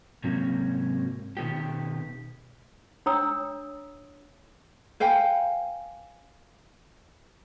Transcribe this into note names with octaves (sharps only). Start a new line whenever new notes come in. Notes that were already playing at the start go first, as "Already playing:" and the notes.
G#2 C3 F#3 A#3 C#4
B2 D#3 B3 G4
D4 C#5 G5 A#5 D#6 E6
B4 F5 G5 G#5